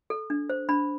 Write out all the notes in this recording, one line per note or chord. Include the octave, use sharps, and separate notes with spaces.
A4
D4
C5
D4 B5